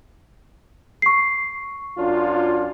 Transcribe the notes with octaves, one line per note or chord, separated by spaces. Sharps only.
C#6 C7
F#2 D4 F4